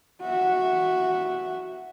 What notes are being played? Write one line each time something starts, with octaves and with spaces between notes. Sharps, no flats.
F#4 E5